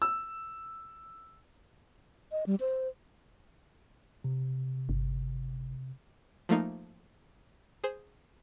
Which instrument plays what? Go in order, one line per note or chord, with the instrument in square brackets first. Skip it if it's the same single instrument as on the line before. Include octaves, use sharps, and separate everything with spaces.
[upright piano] E6
[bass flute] D#5
G3
C5
[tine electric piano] C3
[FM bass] G1
[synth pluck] F3 A3 A#3 D#4
G#4 C5